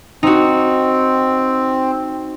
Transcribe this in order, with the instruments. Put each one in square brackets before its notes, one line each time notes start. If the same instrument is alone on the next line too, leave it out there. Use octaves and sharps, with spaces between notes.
[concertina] C4 [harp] D#4 F#4